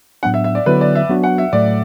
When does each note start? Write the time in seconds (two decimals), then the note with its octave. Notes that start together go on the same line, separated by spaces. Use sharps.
0.23 A2 F#3 B3 D4 F#5
0.34 E5
0.44 E5
0.55 D5
0.66 D3 F#3 B3 E4 B4
0.81 D5
0.95 E5
1.09 F#3 B3 D4 F#4
1.24 F#5
1.38 E5
1.53 A2 F#3 A3 D5